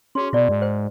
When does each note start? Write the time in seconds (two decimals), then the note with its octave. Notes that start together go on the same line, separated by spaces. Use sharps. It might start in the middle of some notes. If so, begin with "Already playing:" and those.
0.15 C#4 F#4 G#4 C6
0.33 B2 E4 D5
0.49 G#2
0.62 C5 G5